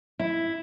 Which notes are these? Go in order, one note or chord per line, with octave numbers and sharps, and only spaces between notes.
E4